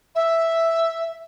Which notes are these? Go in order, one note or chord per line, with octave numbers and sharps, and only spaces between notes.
E5